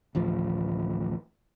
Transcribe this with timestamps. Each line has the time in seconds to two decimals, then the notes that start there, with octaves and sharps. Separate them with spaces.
0.15 D1 A1 F3